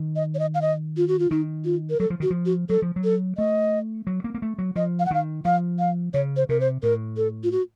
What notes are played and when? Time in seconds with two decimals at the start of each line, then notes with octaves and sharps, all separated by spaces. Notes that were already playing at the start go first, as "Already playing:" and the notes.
Already playing: D#3
0.16 D#5
0.35 C#5
0.39 D#5
0.55 F5
0.62 D#5
0.97 F4
1.08 F#4
1.19 F4
1.31 D#3 D#4
1.65 F4
1.90 A#4
2.00 F#3 A4
2.10 F3
2.20 D#3 F#4
2.30 F3
2.46 F#4
2.70 F#3 A4
2.82 F3
2.96 F#3
3.04 A4
3.37 A3 D#5
4.07 F#3
4.24 A#3
4.34 A#3
4.42 A3
4.58 F#3
4.76 F3 D#5
4.99 F5
5.06 F#5
5.11 D#3 F5
5.45 F3 F5
5.79 F5
6.14 C#3 C#5
6.37 C5
6.49 C3 A#4
6.60 C5
6.83 A2 A#4
7.17 A4
7.43 F4
7.52 F#4